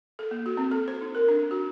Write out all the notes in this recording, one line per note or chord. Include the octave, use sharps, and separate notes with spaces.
A4
A#3
F#4
C4
A4
C5
D#4
A#4
D4
F#4